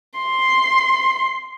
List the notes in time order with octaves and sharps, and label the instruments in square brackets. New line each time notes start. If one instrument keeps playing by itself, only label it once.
[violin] C6